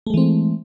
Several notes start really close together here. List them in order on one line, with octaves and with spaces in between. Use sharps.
A3 G#3 E3 C4